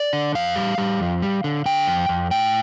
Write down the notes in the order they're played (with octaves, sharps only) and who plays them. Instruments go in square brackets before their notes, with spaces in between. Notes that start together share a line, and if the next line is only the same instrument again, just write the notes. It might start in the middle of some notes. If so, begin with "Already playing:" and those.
Already playing: [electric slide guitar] D5
D3
F2 F5
G3
G3
F2
G3
D3
D3 G5
F2
F2
A2 G5